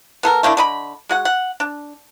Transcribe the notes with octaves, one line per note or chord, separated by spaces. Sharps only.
B3 A4 A#4
A3 A#3 D4 E4
D3 D#5 B5
G#3 F#4 F#5
F#5
D4